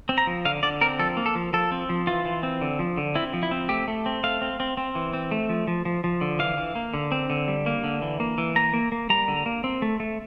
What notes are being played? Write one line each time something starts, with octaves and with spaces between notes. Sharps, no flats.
C4
A#5
F3
D3 F5
D3 D5
C4 A#4
F3 A4
A#3
A4
F3
F3 A4
C4
F3
E3 F4
E3
C4
D3
F3
D3
C4 E4
F3
E4
C4
A3 G4
A3
C4
A3 F5
C4
C4
C4
E3
C4
A3
F3
F3
F3
F3
D3
E3 F5
E3
A#3
D3
C4
D3
G3
A#3
D3
E3
A#3
E3
A#3 A#5
A#3
A#3
G3 A#5
D3
A#3
C4
A3
A3